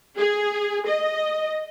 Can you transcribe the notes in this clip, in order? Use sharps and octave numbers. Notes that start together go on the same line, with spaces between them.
G#4
D#5